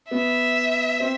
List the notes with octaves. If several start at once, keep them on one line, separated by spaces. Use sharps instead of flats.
B3 E5
C4